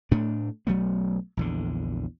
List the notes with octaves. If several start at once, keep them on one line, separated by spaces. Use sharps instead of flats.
A2 A3 D4
B1 F#3 A3 B3
A#1 E2 D3